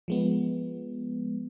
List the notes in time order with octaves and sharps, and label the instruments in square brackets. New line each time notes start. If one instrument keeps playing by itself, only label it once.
[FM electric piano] F3 G#3 B3